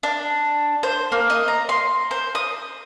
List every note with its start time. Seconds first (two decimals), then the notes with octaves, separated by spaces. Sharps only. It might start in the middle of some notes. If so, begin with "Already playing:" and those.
0.03 D4
0.83 C5
1.12 A#3
1.30 D#5
1.48 A#5
1.69 C6
2.11 C5
2.35 D#6